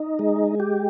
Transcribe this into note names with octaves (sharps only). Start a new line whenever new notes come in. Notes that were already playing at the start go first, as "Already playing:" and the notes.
Already playing: D#4
G#3
G4